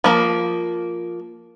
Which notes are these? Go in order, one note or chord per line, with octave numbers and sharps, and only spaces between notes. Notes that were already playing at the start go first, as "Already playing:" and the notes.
F3 A#3